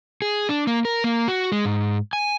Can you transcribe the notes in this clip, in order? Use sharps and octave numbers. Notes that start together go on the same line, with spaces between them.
G#4
D4
A#3
A#4
A#3
F#4
G#3
G#2
G#5